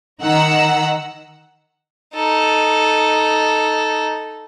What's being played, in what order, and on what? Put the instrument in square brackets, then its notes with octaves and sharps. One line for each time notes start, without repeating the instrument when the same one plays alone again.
[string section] D#3 F#5 A#5 E6
[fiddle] D#4 A4